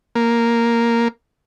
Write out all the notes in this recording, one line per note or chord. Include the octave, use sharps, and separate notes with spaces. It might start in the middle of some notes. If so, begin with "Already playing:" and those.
A#3